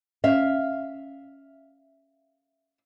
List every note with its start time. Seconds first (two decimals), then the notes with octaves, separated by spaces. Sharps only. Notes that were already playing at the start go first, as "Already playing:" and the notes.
0.24 C#4 E5 F5